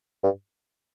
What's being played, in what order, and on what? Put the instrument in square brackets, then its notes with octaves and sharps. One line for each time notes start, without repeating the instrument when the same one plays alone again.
[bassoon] G2